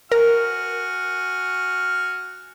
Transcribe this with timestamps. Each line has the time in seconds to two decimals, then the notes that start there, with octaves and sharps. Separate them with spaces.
0.12 F#4 A#4 G#5 F6